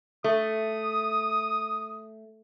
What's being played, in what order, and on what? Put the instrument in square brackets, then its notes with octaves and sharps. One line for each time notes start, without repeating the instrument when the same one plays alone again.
[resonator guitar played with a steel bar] A3 [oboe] D#6